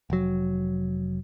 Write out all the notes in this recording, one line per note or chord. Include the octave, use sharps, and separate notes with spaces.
F1 F#3